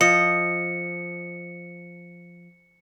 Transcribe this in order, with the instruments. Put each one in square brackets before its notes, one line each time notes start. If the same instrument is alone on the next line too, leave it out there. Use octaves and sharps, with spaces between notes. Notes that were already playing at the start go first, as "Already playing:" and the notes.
[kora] F3 [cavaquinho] D#5 [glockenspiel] C#7